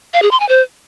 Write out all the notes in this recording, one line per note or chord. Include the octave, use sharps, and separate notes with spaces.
F5
G#4
C6
G#5
C5